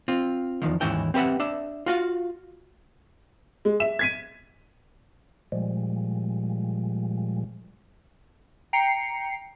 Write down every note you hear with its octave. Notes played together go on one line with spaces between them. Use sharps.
C4 F4
E2 G#2 D#3 F3
D#2 G#2 E3 C#4 E4 G5
C4 G4 B4 E5 F#5
D4 E5
F4 F#4 F5
G#3
E5 E7
G#6 B6 D#7
A#2 F3 G3 G#3
G5 A#5 C7 C#7